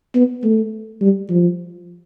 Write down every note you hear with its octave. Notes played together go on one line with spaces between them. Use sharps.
B3
A3
G3
F3